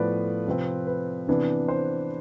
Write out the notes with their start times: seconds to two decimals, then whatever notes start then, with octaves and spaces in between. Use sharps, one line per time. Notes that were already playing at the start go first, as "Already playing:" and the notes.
Already playing: A2 F3 B3 B4 D5
0.47 C3 F3 C4
0.87 B4
1.28 C3 E3 B3 D4
1.68 C5